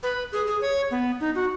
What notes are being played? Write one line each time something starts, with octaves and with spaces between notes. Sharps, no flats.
B4
G#4
G#4
C#5
B3
D#4
F#4